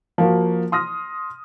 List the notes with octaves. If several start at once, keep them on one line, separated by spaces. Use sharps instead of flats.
F3 A#3 F#4
C6 D#6 F6 A#6